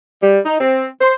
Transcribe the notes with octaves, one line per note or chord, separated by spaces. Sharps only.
G3
D#4
C4
C5